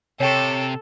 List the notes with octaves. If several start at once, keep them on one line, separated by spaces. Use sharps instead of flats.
C3 A4 C#5 G5 C#6